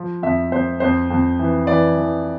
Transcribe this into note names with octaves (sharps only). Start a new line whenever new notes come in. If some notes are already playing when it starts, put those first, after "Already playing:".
Already playing: F3
F2 E5
F2 C5
F2 C5
F2
E3
E3 D5
E3